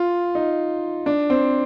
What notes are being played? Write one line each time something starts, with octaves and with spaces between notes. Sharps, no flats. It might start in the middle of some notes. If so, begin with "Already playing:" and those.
Already playing: F4
D#4
D4
C4